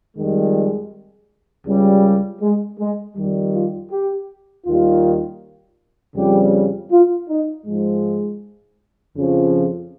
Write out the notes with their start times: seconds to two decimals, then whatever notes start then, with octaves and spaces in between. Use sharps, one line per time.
0.17 F2 D#3 G3 G#3
1.67 C#2 C#3 G3
2.42 G#3
2.79 G#3
3.17 F2 D#3 G3
3.55 F4
3.92 G4
4.66 D#2 D#3 G3 F4
6.16 F2 C#3 G3 G4
6.92 F4
7.29 D#4
7.66 G#2 F3 G#3
9.17 F2 C#3 F3